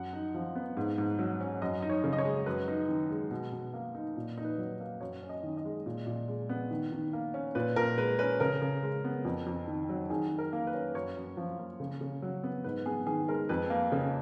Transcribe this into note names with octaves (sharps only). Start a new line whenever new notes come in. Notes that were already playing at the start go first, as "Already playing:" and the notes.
Already playing: F#2 F#5
D#4
F3
B3
G#2
G#2
F#3
C#4
F#2 D#5
D#4
C#5
C#3
D#5
C#5
G#3
F#2 B4
D#4
D#3
G#3
B2
B2
A#3
D#4
A#2
D#4
B4
F#3
A#3
F#2 C#5
C#4
D#5
D#3
D#5
G#3
A#2
A#2
G#3
B3
D#3
D#3
A#3
C#4
A#2 B4
A#2 A#4
G#3 B4
C#4 B4
C#3 A#4
C#3
G#3
B3
F2
F2
D#3
F#3
D#3 G#4
D#3
A#4
A#3
B4
C#4
F#2 C#5
F#2
F3
A#3
C#3
C#3
F#3
B3
G#2 B4
B3 G#4
D#3 G#4
G#3 A#4
F2 B4
A#3
C#3